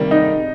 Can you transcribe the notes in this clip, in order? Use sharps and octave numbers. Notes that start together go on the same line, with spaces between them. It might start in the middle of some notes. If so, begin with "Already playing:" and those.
Already playing: C3 D#3 G3 A#3
D#4